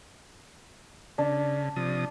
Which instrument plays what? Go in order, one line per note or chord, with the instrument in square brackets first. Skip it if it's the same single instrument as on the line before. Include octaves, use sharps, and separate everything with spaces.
[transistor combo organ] C#3 [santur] D4
[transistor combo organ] C3 F3 D#6